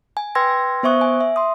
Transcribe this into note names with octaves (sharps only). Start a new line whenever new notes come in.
G#5
B4 G5 C6 E6 G#6 A#6
B3 C5 E5 C#6 D#6 F#6
G#5
E5
C6 D#6